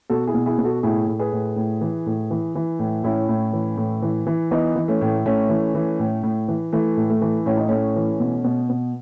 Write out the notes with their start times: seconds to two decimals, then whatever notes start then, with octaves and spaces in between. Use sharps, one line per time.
0.10 B2 F#4 A4
0.27 E4 G#4
0.34 B2
0.46 E4 G#4
0.58 B2
0.64 F#4 A4
0.83 A2 E4 G#4
1.07 A2
1.19 G#4 B4
1.33 A2
1.56 A2
1.81 E3
2.06 A2
2.31 E3
2.55 E3
2.79 A2
3.04 A2 C#4 E4
3.29 A2
3.53 E3
3.77 A2
4.02 E3
4.27 E3
4.51 E3 B3 D#4
4.76 E3
4.88 A3 C#4
5.01 A2
5.26 A2 A3 C#4
5.49 E3
5.75 E3
5.99 A2
6.23 A2
6.48 E3
6.73 E3 A3
6.97 A2
7.10 A3
7.21 E3
7.46 A2 C#4
7.57 D#4
7.68 A2 A3 C#4
7.96 E3
8.20 B2
8.44 B2
8.69 B2